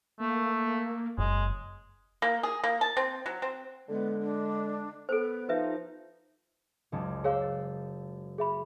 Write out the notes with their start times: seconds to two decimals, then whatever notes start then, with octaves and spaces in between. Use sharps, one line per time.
0.20 A3 A#3
1.18 F#1 G#3
2.22 A#3
2.43 G#4
2.64 A#3
2.81 A5
2.97 C4
3.26 F#3
3.42 C4
3.89 D3 G#3 B3
4.21 D4
5.09 B3 A4 A#4 C5
5.49 F3 D#4 B4 E5
6.92 F#1 C#2 A5
7.24 G#4 C5 C#5 F5 E6 F#6
7.42 A6
8.38 G#4 E5 B5